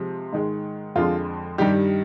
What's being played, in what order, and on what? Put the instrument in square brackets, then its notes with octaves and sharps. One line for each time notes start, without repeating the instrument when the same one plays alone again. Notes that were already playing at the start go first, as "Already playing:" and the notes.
Already playing: [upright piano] C3 F3 G#3
G#2 D#3 G#3
F2 D3 F3 G#3 F4
G2 D#3 G3 G4